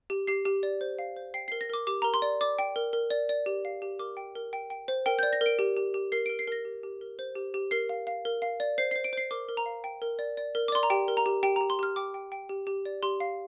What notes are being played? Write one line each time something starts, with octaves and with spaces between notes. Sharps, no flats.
G4
G4 C7
G4
D5
C5
F5
C5
G5 C7
C7
A#4
A#6
A#4 D6
G4 D6
A#4 A#5
C6
D5
D5 D6
G5
A#4
A#4
D5
D5
G4
F5
G4
A#4 D6
G5
A#4
G5
G5
C5
A#4 G5
G6
D5
A#6
A#4 D7
G4
G4
G4
A#4 C7
D7
A#4
C7
A#4 A#6
G4
G4
A#4
C5
G4
G4
A#4 C7
F5
F5
A#4
F5
D5
C5 C7
C7
C5
D7
C5 C7
A#4 D6
A#4
A#5
F5
G5
A#4
D5
D5
A#4
D6
D5 C6
A#5
G4 G5
A#4
A#5
G4
G4 G5
A#5
G4
C6
G4 F6
G5 D6
G5
G5
G4
G4
D5
G4 C6
F5